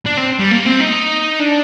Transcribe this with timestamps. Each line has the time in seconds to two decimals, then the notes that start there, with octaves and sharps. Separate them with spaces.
0.06 D4
0.17 C4
0.39 G3
0.51 A#3
0.65 C4
0.80 D#4
1.39 D4